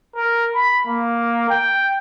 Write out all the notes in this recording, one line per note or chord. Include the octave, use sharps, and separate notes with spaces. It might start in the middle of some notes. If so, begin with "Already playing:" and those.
A#4
B5
A#3
G5